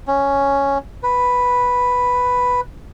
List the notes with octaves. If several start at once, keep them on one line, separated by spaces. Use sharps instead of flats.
C#4
B4